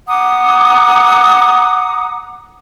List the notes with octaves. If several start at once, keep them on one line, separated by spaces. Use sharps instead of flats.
F#5 A#5 D6 D#6